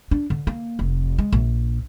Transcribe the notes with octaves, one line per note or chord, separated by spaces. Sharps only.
D4
D3
A#3
F1
G#3
A#1